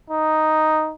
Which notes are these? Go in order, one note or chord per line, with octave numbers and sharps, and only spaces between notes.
D#4